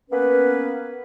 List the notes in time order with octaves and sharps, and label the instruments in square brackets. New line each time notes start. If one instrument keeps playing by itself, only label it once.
[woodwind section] A#3 B3 C#4 B4